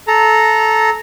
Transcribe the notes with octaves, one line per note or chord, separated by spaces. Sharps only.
A4 A#5